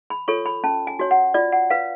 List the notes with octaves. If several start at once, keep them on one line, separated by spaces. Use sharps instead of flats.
B5
F4 A4 C#5 C#6
B5
C#4 A5
G#5
F#4 C#5
F#5
F4 D5
F#5
B4 F5